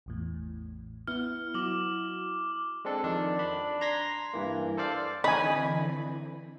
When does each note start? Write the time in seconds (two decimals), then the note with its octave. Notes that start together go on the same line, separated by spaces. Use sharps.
0.06 A1 E2 A2
1.07 B3 E4 F6
1.54 F#3 E4 F#4 D6 F#7
2.85 G#3 C4 D4 A4
3.04 F2 D#3 D4
3.39 D4 B5
3.81 A#5 C6 G#6 A#6 B6
4.34 G2 E3 A#3
4.77 A4 C5 D5 F5
5.24 D3 E3 C4 D#4 G#5 B5